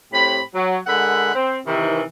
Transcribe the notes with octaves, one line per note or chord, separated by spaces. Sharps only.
A2 C4 G4 B5
F#3
D3 G#3 A#4 E5 F#5 B5
C4
C3 D#3 E3